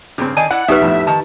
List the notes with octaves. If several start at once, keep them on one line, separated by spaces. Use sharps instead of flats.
G2 C#3 C4
D#3 D5 D#5 G#5 A5
E4 D5 F#5
B1 B3 D#4 G4 B4 E5 F#6
F2 A2
D#3 A5